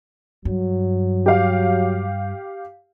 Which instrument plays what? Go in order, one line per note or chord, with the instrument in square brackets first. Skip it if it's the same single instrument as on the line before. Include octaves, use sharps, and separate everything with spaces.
[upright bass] G2 [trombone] F#3
[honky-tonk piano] G4 F5